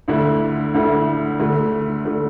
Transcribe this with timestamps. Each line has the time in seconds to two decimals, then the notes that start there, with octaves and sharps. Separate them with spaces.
0.08 D2 D3 A3 E4
0.74 D2 D3 A3 E4
1.40 D2 D3 A3
2.05 D3 A3